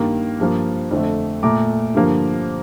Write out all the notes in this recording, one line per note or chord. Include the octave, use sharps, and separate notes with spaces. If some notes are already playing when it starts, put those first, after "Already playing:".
Already playing: G2 D#3 A#3
G2 F3 A#3
F2 D3 A3
A#2 A3 A#5 D6
G2 D3 F3 A#3